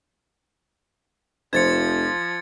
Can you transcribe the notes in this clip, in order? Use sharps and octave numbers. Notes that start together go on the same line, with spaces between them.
F1 F3 C5 G#6 A6 C#7